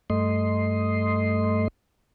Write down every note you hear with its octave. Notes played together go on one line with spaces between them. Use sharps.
G2 A3 D#5 C6